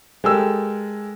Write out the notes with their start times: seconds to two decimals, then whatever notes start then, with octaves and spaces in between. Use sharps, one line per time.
0.24 G#3 G4 A4 A#4 E6